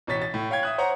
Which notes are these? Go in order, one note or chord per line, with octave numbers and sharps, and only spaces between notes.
A1 B2 C#5 A6 B6
A6
A2
C#5 F5 G5 G#6
E5 D#6 F#6
C5 C#5 F#5 A#5